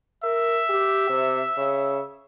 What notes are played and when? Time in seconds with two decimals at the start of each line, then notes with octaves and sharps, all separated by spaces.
0.24 A#4 E5
0.70 G4
1.09 C3
1.57 C#3